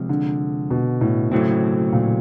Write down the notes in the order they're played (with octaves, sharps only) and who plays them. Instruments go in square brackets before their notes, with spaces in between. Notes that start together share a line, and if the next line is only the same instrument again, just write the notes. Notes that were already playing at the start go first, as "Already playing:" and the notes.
Already playing: [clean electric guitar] F2 C3 F3 G#3
[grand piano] D3
B2
A2
[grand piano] A2 [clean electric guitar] C#3 F#3 A3 C4
[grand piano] A#2